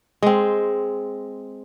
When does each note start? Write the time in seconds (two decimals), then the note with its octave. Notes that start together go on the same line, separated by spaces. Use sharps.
0.22 G#3 C4